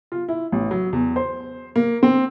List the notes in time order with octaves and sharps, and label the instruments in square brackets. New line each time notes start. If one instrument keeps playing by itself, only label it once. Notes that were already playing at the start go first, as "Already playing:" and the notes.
[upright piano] F4
E4
A1
F#3
E2
C5
A#3
C4